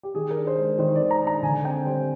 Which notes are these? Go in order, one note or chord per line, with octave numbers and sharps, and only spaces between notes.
G4
D#3 G#4
A#4
D4
C5
G#3
D#3 C5
D5
D#3
A#5
D4
A#5
D3 G#5
C4 G5
G3 C5